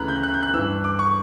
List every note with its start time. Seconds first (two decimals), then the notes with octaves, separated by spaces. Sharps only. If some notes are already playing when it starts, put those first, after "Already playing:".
Already playing: D2 C#3 E3 A#5 B5 F#6
0.08 G6
0.23 F#6
0.34 G6
0.43 F#6
0.54 G2 E3 E6
0.84 D6
0.99 C#6